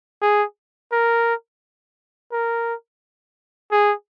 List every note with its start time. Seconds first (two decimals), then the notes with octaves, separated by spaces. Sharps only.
0.22 G#4
0.92 A#4
2.32 A#4
3.72 G#4